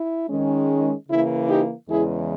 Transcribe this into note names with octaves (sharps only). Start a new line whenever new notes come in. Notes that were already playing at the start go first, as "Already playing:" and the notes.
Already playing: E4
D#3 G#3 C#4
C#3 E3 A#3 E4
D#4 G4
E2 C#3 E3 G#3 E4 G#4